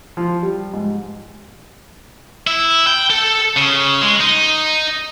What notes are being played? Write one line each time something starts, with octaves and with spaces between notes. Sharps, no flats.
F3
G3
G#2
E4
G5
A4
C#3
G#3
D#4